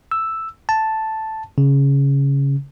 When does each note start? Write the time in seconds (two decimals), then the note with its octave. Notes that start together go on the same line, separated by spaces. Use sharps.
0.12 E6
0.69 A5
1.58 C#3